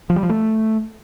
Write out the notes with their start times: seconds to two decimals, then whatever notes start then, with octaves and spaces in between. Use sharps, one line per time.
0.10 F3
0.16 G3
0.23 F3
0.29 A3